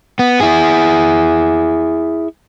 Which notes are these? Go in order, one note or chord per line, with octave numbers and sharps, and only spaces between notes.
B3
E4 G#4